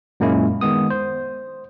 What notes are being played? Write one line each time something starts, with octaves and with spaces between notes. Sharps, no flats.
F#2 A#2 G#3 A#3 C#4 E4
D#3 G#3 B3 D#6
C5